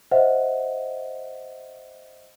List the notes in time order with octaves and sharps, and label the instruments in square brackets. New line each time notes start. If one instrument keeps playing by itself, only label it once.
[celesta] C5 D#5 E5 F#5